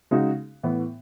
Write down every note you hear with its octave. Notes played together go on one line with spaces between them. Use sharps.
C#3 G#3 D#4 F#4
A2 E3 B3